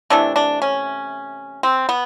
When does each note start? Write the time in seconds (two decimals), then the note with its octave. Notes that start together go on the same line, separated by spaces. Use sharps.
0.10 C3 E3 A3 D4
0.36 D4
0.62 C#4
1.63 C4
1.89 B3